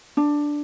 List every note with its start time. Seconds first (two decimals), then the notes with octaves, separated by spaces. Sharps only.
0.17 D4